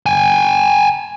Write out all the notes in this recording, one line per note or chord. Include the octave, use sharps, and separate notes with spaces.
G5 G#5